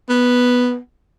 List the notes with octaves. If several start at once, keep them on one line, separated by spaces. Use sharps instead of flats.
B3